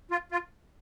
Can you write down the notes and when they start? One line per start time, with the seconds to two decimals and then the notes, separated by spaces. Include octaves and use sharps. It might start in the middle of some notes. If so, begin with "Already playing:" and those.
0.11 F4
0.32 F4